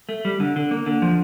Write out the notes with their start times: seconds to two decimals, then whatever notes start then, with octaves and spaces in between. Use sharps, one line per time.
0.09 A3
0.25 G3
0.40 D3
0.56 D3
0.71 A#3
0.86 D3
1.02 F3